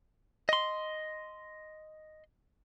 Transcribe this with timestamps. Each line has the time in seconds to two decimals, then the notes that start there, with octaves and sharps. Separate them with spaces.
0.49 D#5 C6